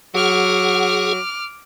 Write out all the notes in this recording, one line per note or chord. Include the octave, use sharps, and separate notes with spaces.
F#3 G#4 F#5 D6 F6